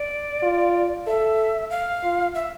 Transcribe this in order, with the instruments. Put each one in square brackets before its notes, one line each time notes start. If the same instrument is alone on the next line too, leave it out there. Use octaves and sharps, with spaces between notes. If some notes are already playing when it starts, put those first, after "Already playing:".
Already playing: [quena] D5
[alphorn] F4
[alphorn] A4 [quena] E5
[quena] F5
[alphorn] F4
[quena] E5